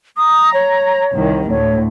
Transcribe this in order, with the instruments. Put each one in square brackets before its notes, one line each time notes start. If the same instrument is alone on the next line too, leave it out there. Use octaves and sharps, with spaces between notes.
[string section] A#5 [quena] D#6
[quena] C#5
[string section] C2 D#3
[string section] D2 A2 [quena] C#5